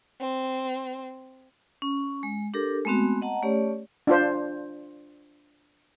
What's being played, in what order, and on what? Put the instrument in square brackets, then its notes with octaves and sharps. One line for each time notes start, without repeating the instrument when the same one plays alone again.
[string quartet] C4
[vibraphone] C#4
G#3
D4 G4 A4 A#4
G#3 A3 B3 C4 F#4
D#5 F#5 A5 A#5
A3 C#4 G4 C#5 D5
[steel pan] D4 F4 C5